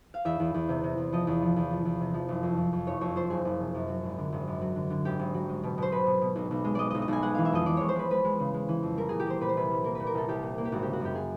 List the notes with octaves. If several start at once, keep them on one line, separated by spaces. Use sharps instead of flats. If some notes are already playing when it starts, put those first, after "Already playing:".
F5
E2 E5
E2
E2
C3
C3
E2
F3 D#5
E2
F3
E2
F3
E2
C3
F3
F#1
F2
F3
F2
F#1 C#5
F2 C#5
F3 C5
F#1 G#4
F#1
C3
F#2
F#3
G#1
D3
G#1
F#2
F#3
D3
D3
G#1 G4
G#1
F#3
G#3
B2
B2 C5
B2 B4
B2
B2
B1
B1
G#3
G#3 D5 D#5
B1 D#5
D#5
B1 G#5
G#3 F#5
E3 F5
E5
F2 D#5
E3 D5
G#3 C#5
C5
G#3 B4
G#3 B4
G#3
C#3
G#3
E3
F2
G3 A#4
A#2 G#4
G4
A#3 C5
A#2 B4
C5
C2 B4
G3
A#3 A#4
A#2 B4
A#4
C2 A4
C2 G4
A#2
A#3
G4
G#1 F#4
C#3 G4
F#4
F#2 G4
G#4